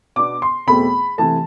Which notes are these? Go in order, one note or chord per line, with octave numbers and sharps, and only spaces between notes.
B2 B3 D4 D6
C6
E2 B2 A3 C4 B5
C3 E3 A3 A5